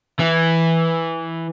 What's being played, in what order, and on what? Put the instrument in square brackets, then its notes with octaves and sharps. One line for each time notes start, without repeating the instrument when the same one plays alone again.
[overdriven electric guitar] E3